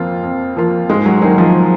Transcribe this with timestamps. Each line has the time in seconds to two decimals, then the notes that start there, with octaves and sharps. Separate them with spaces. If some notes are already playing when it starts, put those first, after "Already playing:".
Already playing: F2 F3 A#3 F4
0.23 F2
0.57 F3 A#3 F4
0.89 G#2 G#3
1.06 F#3
1.22 D#3 F#3 A#3 D#4 G#4
1.38 F3